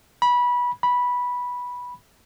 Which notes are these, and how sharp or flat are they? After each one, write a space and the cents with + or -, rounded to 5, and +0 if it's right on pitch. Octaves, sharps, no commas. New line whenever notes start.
B5 -20
B5 -10